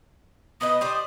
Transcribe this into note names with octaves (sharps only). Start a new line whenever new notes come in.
B2 B4 D#5 D#6
G4 C5 D5